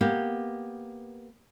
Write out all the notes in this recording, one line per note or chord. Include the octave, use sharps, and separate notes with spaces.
A#3 B3 G4